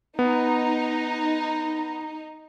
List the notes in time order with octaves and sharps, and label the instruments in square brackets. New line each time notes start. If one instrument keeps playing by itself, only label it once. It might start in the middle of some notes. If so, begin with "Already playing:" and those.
[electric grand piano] B3 [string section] D#4